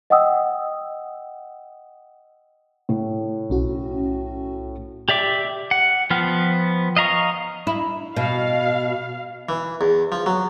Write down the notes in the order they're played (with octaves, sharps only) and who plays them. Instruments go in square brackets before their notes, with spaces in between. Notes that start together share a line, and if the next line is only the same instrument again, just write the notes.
[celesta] D#5 F#5 G5 D#6 E6
[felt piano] A2
[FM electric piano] B1 C#4 F#4
[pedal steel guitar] G4 D5 E5 D6
F#5
F3 B3 G5 F6
D#5 F5 A#5 C#6
[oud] E4
[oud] B2 [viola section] F5
[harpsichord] E3
E2
F3
F#3